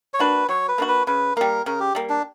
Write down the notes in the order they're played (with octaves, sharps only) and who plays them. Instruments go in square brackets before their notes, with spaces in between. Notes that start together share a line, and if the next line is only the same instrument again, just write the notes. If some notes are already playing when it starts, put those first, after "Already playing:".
[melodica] C#5
[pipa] A#3 D4 F#4 [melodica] B4
[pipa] F#3 [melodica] C#5
[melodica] B4
[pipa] A#3 D4 F#4
[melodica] B4
[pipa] C#3 [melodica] B4
[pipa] G3 A#3 [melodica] A#4
[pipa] C#3 [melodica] A#4
[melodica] G4
[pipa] G3 A#3
[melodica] D4